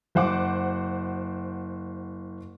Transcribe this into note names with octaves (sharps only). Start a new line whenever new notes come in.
F#1 C5 F#5 D6